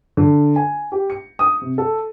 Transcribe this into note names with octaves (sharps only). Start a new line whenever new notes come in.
D3
G#5
G4
C#7
D#6
C3
A4